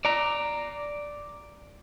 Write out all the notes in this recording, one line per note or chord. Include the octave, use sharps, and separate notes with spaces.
D5 A#5